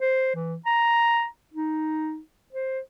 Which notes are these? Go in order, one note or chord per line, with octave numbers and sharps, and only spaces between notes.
C5
E3
A#5
D#4
C5